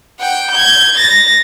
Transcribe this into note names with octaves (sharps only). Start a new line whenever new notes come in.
F#5 G5
G6 G#6
A6 A#6